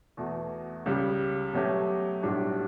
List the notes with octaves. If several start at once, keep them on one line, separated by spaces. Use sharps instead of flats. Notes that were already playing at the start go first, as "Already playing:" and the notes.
E2 B2 A3
C#2 C#3 G3
B2 F#3 A3 C#4 G4
B1 A2 G3 D4 F#4